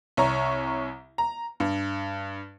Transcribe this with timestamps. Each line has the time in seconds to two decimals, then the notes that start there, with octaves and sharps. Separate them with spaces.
0.17 C2 C#5 A#5
1.18 A#5
1.60 G2